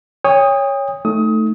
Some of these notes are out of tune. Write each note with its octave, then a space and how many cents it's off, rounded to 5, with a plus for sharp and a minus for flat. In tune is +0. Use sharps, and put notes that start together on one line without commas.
C#5 +0 G5 +40 D#6 +0
A3 +0 D#4 +0 D#6 +25